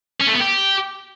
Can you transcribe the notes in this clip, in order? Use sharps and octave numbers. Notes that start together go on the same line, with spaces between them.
C#4
A3
B3
G4